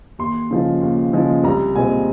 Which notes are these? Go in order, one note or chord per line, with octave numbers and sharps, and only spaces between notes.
D#2 C6
C#3 F3 G#3
D#2
C#3 F3 G#3
C2 A#5
A#2 G#3 C4 G#5